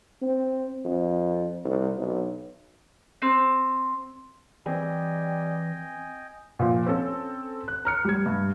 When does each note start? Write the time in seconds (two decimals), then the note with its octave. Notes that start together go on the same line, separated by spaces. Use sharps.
0.22 C4
0.85 F2
1.65 C2
1.97 B1
3.22 C4
4.66 E3 G3 C4 G#4 D#5 G5 G#5
6.59 A#2 F3
6.86 C4 C#4 A4
7.68 F#6
7.85 A#5 F6 C#7
8.05 G3 G#6
8.26 G2